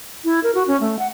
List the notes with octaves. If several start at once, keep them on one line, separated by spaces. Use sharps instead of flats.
E4
A#4
F#4
C#4
A3
F#5